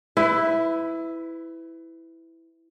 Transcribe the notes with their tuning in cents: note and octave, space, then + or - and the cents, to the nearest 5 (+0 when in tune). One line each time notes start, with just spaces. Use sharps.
E4 +0 B4 +30